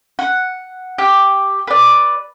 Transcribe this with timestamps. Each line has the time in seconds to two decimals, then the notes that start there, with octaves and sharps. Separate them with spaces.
0.19 F#5
0.98 G4
1.67 B4 D5